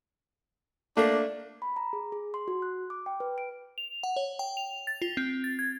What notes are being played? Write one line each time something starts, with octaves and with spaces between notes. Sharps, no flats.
A3 A#3 D4
B5
A#5
G#4
G#4
C6
F#4
F#6
D6
G5
B4
D7
F7
F#5
C#5
G5
F7
A6
F4
C4
A6
G#6